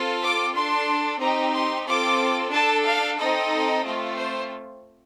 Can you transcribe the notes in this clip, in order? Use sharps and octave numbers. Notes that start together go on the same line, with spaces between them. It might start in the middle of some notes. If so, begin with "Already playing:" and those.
Already playing: C4 F4 A4
D6
D4 A4 C6
C4 D#4 G4 A#5
C6
C4 F4 A4 D6
D4 A4 A5
F5
C4 D#4 A4 D#5
A3 C4 F4
C5